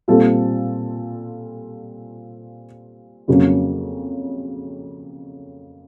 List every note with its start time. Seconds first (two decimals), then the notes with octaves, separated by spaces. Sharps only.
0.08 A#2 G3 C4 F4 A4
3.28 F2 C#3 F#3 A#3 C#4